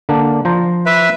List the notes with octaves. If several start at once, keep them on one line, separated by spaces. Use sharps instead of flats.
D3 A#3 D4
F3 C5 A#5
B4 E5